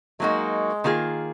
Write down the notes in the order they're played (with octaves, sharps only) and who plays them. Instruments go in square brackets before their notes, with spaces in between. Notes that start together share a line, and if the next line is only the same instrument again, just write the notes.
[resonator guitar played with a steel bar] F#3 A#3 D#4 F#4 [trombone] G#3
[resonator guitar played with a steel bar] D#3 A#3 F4 G#4